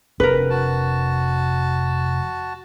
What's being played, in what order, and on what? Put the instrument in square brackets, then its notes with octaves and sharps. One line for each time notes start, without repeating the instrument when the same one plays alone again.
[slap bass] F1 C4 D4 [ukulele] A#4 B4
[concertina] F#4 A5